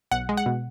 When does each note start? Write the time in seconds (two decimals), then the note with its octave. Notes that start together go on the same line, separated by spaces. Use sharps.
0.11 B1 F#5
0.29 G#3
0.37 F#5
0.46 B2